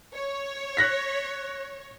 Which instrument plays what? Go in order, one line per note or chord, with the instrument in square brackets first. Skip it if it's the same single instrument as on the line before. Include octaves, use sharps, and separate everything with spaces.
[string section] C#5
[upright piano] F#6 A#6 B6